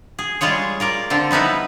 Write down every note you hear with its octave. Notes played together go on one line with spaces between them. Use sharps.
G#4
G3 G#3 F4 G#4 C#5
F4 A#4 D5
D3 C4 F4
G3 B3 D#4 E4 B4